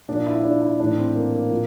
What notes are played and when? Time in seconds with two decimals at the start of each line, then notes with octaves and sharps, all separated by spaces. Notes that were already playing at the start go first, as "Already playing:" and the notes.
0.08 A#2 F3 D4
0.27 E4
0.43 D4
0.62 E4
0.80 A2 E3 D4
0.97 C4
1.15 A#3
1.34 A#3
1.51 A#2 F3